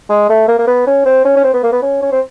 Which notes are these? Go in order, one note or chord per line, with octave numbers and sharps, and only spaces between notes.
G#3
A3
A#3
A#3
B3
C#4
C4
C#4
C#4
C4
B3
A#3
B3
C#4
C#4
C4